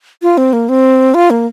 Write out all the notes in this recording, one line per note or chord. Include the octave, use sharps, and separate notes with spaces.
F4
C4
A#3
C4
F4
A#3